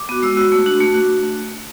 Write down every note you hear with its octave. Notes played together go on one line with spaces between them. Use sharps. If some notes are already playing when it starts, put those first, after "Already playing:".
Already playing: D6
B3 F#4
G#3 E6
B3 F#4
A3
D4 F#4
A3
D4 F#4